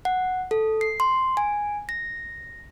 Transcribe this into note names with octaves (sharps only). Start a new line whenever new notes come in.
F#5
A4
C7
C6
G#5
A#6